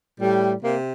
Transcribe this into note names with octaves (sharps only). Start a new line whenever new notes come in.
A2 G3
C3 A#3